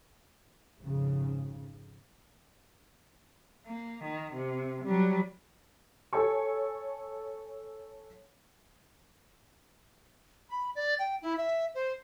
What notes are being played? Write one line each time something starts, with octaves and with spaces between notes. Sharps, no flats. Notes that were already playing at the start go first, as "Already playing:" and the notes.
G#1 F2 G#2 C#3
A#3
D#3
C3
F#3 G3
A4 C#5 G#5 C#6
B5
D5
G5
E4
E5
C5